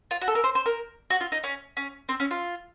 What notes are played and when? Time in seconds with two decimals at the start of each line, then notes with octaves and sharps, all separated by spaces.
0.11 F4
0.21 F#4
0.28 A4
0.35 A#4
0.44 C5
0.55 C5
0.66 A#4
1.10 F#4
1.21 F4
1.32 D#4
1.44 C#4
1.77 C#4
2.09 C4
2.20 C#4
2.31 F4